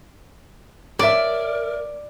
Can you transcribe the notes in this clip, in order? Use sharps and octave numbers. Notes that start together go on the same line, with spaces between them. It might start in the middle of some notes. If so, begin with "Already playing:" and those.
A#4 C#5 D5 E5